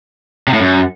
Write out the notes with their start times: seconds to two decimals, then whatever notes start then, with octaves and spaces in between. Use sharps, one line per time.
0.48 C3
0.54 A2
0.60 F#2